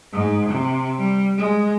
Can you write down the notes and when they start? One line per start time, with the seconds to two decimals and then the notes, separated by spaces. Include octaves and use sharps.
0.12 G#2
0.48 C3
0.97 G3
1.37 G#3